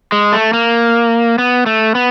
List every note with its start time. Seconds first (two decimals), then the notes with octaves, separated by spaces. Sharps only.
0.12 G#3
0.32 A3
0.53 A#3
1.38 B3
1.66 A3
1.95 B3